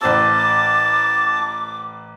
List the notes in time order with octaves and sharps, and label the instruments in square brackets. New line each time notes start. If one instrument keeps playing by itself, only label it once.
[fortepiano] A1 C5 E6 [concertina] A5 [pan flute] D6